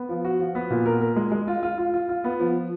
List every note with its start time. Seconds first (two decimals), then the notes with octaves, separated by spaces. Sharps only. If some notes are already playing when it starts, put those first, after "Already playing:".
Already playing: B3
0.09 F3
0.25 F#4
0.40 F3
0.55 B3
0.70 A#2
0.86 A#4
1.01 A#4
1.16 G#3
1.32 G#3
1.48 F4
1.63 F4
1.78 F4
1.94 F4
2.09 F4
2.24 B3
2.39 F3